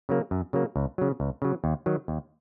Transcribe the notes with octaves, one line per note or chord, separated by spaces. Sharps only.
C#3 F#3 A#3
F#2
C#3 F#3 A#3
C#2
C#3 F#3
C#2
C#3 F#3
D#2
D#3 F#3
D#2